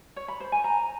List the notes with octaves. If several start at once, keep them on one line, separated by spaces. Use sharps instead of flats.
C#5
B5
C5
G#5
A#5